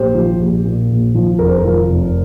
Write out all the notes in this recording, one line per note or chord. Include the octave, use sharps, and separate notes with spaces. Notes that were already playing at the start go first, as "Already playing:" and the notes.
Already playing: A#1 G4 C5
F3
A#1
A#2
A#1
F3
F1 A#4
C5
A#4
F3
F1